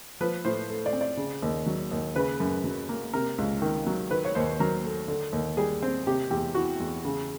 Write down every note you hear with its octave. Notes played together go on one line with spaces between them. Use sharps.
F3 B4
A2 C5
A3
D5
C4
D5
C#3
D#2
F#3
D#2
C#3 B4
F#2
F#3
A#3
C3 A#4
C#2
D#3
F#3
D#3 B4
C#5
D#2 C5
F#3 A#4
A3
D3
D#2
G3 G#4
C4
C3 G4
E2 G4
E3 F#4
E2
C#3